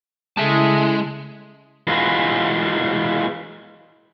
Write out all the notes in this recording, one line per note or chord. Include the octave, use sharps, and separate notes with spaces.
C#3 G#3 E4 A4 E5 A5
E3 G#3 F4 F#4 B4